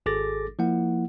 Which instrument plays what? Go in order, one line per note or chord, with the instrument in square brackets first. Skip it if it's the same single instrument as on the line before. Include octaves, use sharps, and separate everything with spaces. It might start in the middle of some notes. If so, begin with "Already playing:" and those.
[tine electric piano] G#1 G#4 A4 D6 A6 A#6
F3 A#3 E4 F#5